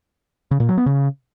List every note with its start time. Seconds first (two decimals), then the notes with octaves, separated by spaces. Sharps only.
0.51 C#3
0.60 A#2
0.69 F#3
0.77 B3
0.86 C#3